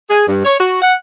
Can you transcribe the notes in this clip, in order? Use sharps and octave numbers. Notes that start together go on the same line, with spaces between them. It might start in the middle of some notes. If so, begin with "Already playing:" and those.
G#4
G2
C#5
F#4
F#5